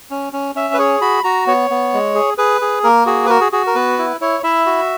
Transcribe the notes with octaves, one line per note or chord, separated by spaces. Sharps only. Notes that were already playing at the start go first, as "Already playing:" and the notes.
C#4
C#4
C#4 E5
B4
G#4 C#5
F#4 B5
F#4 A#5
B3 C#5
B3
G#3
G#4
G#4 B4
G#4
A#3 A#4
F#4 G#4
B4
F#4 A#4
G#4
F#4 G#4
A#4
B3 B4
E4
E4 C#5
E4 E5
F#4